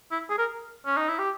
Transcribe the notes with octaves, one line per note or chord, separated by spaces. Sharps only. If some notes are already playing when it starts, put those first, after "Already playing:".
E4
G#4
A#4
C#4
D#4
E4
G4